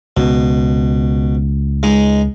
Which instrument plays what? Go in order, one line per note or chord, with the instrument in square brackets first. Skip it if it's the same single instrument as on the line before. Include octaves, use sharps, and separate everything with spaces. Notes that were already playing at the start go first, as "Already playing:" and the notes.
[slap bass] C#2 [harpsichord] B2
[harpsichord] G#3 D#4